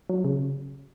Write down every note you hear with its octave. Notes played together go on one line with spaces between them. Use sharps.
F#3
C#3